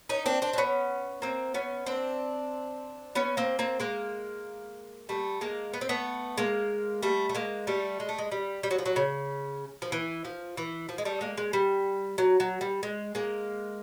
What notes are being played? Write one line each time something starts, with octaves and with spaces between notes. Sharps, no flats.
C#4 D#4
C4 D4
C4 D4
D4
B3 C#4
A#3 C4
B3 C#4
C4 D4
B3 C#4
A#3 C4
A#3 C4
G#3 A#3
G3 A3
G#3 A#3
B3
C4
A3 B3
G#3 A#3
G3 A3
A3
G#3 A#3
G3 A3
G#3
A3
G#3
G3
G3
F#3
F3
F#3
C#3
F3
E3
F3
E3
F3
G#3
G3 A3
G#3 A#3
G#3
G3
F#3
F#3
G3
G#3
G#3 A#3